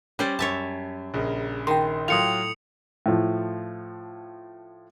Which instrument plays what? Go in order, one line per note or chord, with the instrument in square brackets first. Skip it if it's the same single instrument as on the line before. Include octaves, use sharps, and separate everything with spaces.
[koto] G3 C5 D5 [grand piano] C#4
[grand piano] F#2 [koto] C#5 E5 A5
[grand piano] A#1 C#3 A#4
[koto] D#3 [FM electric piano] G5 C6
[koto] A2 [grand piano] F#3 F4 [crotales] D#6 C#7 F7
[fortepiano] A2 F3